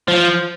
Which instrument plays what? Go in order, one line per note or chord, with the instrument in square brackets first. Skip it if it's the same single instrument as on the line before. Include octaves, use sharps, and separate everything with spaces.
[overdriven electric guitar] F3